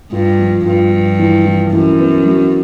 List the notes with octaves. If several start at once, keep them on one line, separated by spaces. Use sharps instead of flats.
G2 F4
F3
G2 F4
F3
E3
E3
F#2 E3
B3
F#3